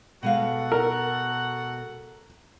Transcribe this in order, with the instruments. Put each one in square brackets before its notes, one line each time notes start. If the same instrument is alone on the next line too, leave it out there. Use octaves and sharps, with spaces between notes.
[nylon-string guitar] B2 G#3 F5 [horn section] F#4 A4 F#5
[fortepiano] A#4